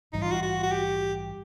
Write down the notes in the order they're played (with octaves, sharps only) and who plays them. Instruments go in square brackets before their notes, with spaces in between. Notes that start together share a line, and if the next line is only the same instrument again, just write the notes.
[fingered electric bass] A#1 G#2 E3 G3 [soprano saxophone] D#4
[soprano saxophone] F4
F#4
F#4
F#4
G4